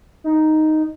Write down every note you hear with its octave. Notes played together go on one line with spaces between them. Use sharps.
D#4